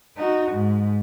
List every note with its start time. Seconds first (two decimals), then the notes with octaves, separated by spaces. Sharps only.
0.17 D#4 F#4
0.51 G#2